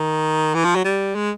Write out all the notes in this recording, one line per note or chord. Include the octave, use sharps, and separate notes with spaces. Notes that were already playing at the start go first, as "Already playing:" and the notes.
Already playing: D#3
E3
F3
F#3
G3
G#3